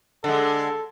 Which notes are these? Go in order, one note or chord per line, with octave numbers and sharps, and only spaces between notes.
D3 G#3 A4